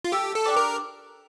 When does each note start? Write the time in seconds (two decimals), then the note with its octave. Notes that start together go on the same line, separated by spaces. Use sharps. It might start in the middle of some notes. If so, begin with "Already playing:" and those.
0.04 F4
0.12 A3 G4
0.35 A4
0.45 D4 G4 D5
0.56 A#4